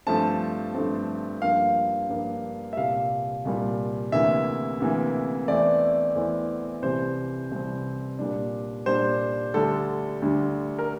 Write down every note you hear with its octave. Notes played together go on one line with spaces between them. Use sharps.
G2 F3 A3 C4 A5
G2 F3 A3 C4
G2 F3 A#3 F5
G2 F3 A#3
E5
C2 A#2 G3 F5
C2 A#2 G3
D2 C3 E3 A#3 E5
D2 C3 E3 A#3
E2 E3 A3 C4 E4 D5
E2 E3 A3 C4 E4
C2 C3 E3 G3 C4 C5
C2 C3 E3 G3 C4
A#2 G3 D4
A#2 G3 D4 C5
D2 D3 G3 A4
D2 D3 G3
A#4